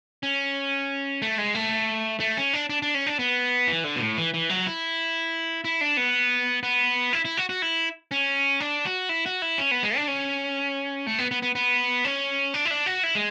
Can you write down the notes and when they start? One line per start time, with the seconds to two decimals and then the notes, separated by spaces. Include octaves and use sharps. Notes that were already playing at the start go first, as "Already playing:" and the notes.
0.23 C#4
1.22 A3
1.38 G#3
1.55 A3
2.20 A3
2.37 C#4
2.54 D4
2.70 D4
2.82 D4
2.95 C#4
3.07 D4
3.19 B3
3.68 E3
3.84 D3
3.96 B2
4.01 A2
4.17 E3
4.34 E3
4.49 F#3
4.67 E4
5.64 E4
5.81 D4
5.97 B3
6.63 B3
7.13 E4
7.25 E4
7.37 F#4
7.49 F#4
7.62 E4
8.11 C#4
8.60 D4
8.85 F#4
9.09 E4
9.26 F#4
9.42 E4
9.58 C#4
9.71 B3
9.83 G#3
9.96 D4
10.08 C#4
11.07 A3
11.19 B3
11.31 B3
11.42 B3
11.55 B3
12.05 C#4
12.54 D4
12.65 E4
12.71 D4
12.86 F#4
13.04 E4
13.15 G#3